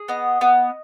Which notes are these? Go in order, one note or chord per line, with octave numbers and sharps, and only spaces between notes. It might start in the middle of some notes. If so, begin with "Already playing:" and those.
Already playing: G#4
B3 D#5
B3